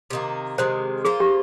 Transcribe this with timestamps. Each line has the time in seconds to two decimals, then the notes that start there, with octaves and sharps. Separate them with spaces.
0.10 C3 D#3 A#3
0.58 C3 D#3 G#3 C5
1.05 A#3 F4 G#4 C5
1.20 G4